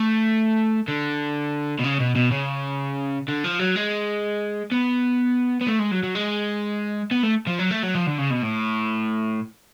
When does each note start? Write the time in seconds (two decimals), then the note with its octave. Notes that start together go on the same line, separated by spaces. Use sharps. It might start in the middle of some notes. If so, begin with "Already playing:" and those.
Already playing: A3
0.88 D3
1.79 B2
1.84 C#3
2.00 B2
2.16 B2
2.32 C#3
3.28 D3
3.44 F3
3.59 F#3
3.76 G#3
4.71 B3
5.61 B3
5.67 A3
5.79 G#3
5.91 F#3
6.03 F#3
6.15 G#3
7.11 B3
7.23 A3
7.47 F3
7.59 F#3
7.71 A3
7.83 F#3
7.95 F3
8.07 D3
8.19 C#3
8.31 B2
8.43 A2